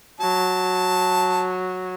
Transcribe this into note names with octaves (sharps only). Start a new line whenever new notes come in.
F#3 A5